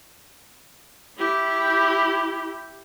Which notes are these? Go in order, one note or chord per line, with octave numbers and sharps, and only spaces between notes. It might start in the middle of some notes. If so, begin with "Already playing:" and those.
E4 G4